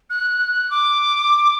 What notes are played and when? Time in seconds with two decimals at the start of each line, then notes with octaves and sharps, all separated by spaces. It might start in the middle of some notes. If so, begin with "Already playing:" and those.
0.10 F#6
0.70 D6